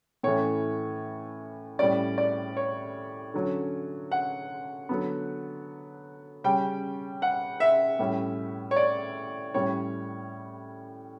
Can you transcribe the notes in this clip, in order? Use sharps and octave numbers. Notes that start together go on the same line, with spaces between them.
A2 E3 A3 C#4 C#5
A2 G3 C#4 D5
D5
C#5
D3 F#3 C#4
F#5
D3 F#3 B3
C#3 G3 C#4 G5
F#5
E5
A2 G3 C#4
C#5
D5
A2 G3 C#4 C#5